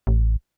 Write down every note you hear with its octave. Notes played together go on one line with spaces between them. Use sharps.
A1